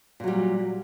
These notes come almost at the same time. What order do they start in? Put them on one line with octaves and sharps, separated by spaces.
A#2 F#3 G3